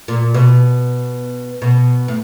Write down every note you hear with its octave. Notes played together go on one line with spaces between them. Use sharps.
A#2
B2
B2
A2